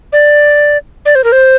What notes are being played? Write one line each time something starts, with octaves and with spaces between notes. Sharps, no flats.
D5
D5
C5
A#4
C5